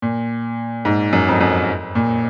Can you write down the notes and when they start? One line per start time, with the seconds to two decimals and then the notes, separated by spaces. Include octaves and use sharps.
0.02 A#2
0.85 G#2
1.13 F#2
1.28 F2
1.41 F#2
1.95 A#2